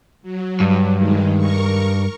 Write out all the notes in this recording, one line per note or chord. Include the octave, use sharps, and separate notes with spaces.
F#3
G2
D#3 G#3
A#4 C#6